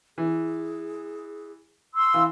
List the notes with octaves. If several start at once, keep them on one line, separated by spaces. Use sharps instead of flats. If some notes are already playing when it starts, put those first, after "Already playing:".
E3 G#4
C6 E6
E3 F5